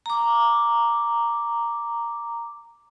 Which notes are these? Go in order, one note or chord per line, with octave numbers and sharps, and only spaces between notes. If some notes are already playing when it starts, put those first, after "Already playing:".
A#5 D6